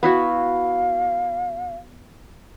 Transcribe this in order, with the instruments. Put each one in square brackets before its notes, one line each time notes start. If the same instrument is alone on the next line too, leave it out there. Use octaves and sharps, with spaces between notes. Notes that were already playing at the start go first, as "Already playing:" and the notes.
[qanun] B3 E4 F#4 [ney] F5